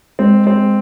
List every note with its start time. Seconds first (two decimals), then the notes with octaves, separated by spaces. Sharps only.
0.19 G#3 C4
0.37 G#3
0.47 C4
0.56 G#3